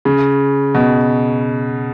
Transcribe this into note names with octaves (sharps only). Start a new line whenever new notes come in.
C#3
B2